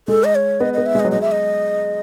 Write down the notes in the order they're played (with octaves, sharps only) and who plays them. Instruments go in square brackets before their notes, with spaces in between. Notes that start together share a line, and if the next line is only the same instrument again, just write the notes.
[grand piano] G#3 [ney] A4
[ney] D#5
C#5
[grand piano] B3 [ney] D#5
[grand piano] B3 [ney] D#5
[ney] E5
[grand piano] G#3 [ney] D#5
[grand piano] F#3
[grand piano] G#3 [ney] D#5
[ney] E5
D#5